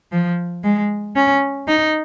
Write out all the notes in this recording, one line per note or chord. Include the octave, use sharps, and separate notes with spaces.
F3
G#3
C#4
D#4